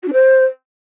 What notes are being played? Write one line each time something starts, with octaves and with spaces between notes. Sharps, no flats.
F#4
D4
C5